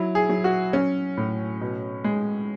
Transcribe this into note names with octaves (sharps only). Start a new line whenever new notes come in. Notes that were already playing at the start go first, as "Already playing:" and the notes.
Already playing: F#3 E4
G#4
F#3
F#4
F#3 C#4
A2
B2
G#3